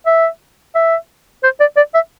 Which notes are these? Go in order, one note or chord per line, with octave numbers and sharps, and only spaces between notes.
E5
E5
C5
D5
D5
E5